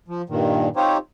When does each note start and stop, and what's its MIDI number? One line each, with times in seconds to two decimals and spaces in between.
0.08 0.22 53
0.30 0.68 43
0.30 0.68 46
0.30 0.68 51
0.76 0.97 60
0.76 0.97 63
0.76 0.97 65
0.76 0.97 67
0.76 0.97 72
0.76 0.97 73